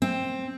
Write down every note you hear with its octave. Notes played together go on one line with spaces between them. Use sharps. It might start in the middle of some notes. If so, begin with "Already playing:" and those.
C4